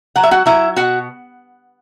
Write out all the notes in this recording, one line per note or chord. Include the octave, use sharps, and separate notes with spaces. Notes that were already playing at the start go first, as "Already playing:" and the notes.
F#3 F#5
E5
F#4 F#5
F#3 E4 E5
B2 F#4 F#5